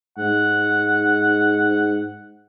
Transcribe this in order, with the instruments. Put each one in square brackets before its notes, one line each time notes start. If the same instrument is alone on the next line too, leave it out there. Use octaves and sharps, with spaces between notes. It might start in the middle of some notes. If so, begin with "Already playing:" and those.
[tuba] G#2 [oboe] F#5